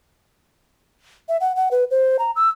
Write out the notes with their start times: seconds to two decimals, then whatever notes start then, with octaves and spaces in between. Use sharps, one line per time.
1.29 E5
1.41 F#5
1.56 F#5
1.71 B4
1.91 C5
2.19 A#5
2.36 E6